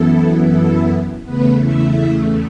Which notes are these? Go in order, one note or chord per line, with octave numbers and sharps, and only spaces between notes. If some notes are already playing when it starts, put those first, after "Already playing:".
Already playing: F#2 E3 B3 E4 A4
A4
E2 C#3 A3 B3 B4
E4 E5